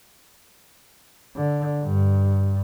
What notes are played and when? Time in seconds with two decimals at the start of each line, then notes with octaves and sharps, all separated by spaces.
1.36 D3
1.82 G2